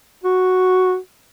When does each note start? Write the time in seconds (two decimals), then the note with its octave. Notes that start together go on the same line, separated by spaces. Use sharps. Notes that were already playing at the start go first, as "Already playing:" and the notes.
0.24 F#4